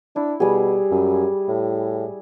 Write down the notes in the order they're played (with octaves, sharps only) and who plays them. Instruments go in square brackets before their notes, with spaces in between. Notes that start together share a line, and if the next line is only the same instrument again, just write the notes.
[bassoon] D4 [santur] E4
[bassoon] B2 [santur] G3 G#4
[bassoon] F#2
A2